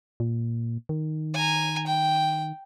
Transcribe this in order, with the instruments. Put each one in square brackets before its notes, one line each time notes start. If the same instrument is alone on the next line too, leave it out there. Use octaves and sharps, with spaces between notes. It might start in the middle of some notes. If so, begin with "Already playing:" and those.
[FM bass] A#2
D#3
[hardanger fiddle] G#5 A#5
G5